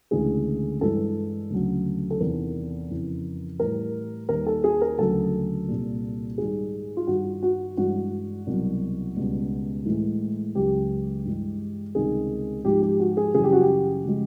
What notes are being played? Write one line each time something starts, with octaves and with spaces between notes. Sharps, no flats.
D2 C#3 E3 G#3 G#4
G2 E3 G#3 A4
D2 C#3 F#3
A4
E2 C3 D#3 A#4
F2 C#3 E3
A2 E3 G3 A#4
D#2 D#3 G3 A#4
A4
G#4
A#4
D2 C#3 F#3 A4
C2 A#2 G3
G#2 D#3 G3 G#4
F4
G2 D#3 G3 F#4
F#4
G2 E3 G#3 F#4
C2 B2 F#3
C#2 B2 G3
A2 E3 G#3
C#2 C#3 F#3 G4
G2 E3 G#3
C#2 C3 D#3 G3 G#4
G#2 F3 G#3 G4
G4
F#4
G#4
F#2 C#3 E3 G3 G#4
G4
F#4
G4
C#3 F3 G#3